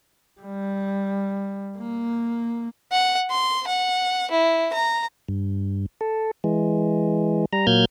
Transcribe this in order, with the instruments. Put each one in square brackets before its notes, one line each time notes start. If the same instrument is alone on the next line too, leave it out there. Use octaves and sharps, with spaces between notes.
[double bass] G3
A#3
[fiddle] F#5
C6
F#5
E4
A#5
[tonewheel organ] G2
A4
E3 G#3
G3 A#5
A#2 F#3 A#3 F6 G6 G#6